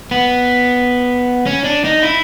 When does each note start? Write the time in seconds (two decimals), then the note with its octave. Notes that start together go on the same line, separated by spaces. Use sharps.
0.11 B3
1.46 C#4
1.64 D4
1.85 D#4
2.03 E4